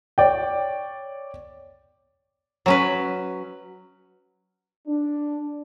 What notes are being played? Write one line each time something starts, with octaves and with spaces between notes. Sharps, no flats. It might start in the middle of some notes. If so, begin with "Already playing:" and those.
C#5 D5 G5
F#3 C#4 B4
D4